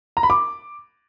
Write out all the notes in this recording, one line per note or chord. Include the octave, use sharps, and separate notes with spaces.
A#5
B5
D6